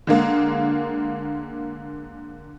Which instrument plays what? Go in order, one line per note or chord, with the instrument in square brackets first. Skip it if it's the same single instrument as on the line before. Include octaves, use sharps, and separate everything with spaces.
[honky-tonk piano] D3 G#3 A#3